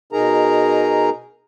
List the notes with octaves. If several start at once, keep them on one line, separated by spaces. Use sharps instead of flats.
B2 D#4 G#4 A#4 A#5